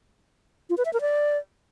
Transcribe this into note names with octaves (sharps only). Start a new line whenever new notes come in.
F4
B4
E5
A#4
D5